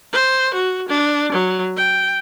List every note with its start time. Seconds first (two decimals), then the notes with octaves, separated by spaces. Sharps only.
0.13 C5
0.54 F#4
0.89 D4
1.32 F#3
1.77 G5